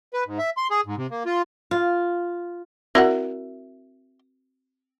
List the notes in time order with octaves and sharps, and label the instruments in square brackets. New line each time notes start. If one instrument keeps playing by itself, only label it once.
[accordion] B4
G#2
E5
C6
G#4
G#2
C3
A#3
F4
[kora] F4
[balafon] C4 F#4 A#4 [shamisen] E4 D5 F#5